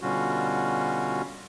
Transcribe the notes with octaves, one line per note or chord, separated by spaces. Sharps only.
B2 D3 G3 C#4 F4 F#4